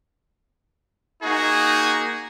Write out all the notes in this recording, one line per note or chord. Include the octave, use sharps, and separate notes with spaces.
A#3 D#4 F#4 G#4